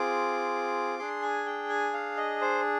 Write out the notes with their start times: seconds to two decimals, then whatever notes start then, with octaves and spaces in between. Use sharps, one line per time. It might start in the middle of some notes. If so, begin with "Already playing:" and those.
Already playing: C4 F4 G#4 D6
0.99 D4 G#4 C6
1.22 G#5
1.46 G5
1.69 G#5
1.94 F5
2.17 D#5
2.41 C5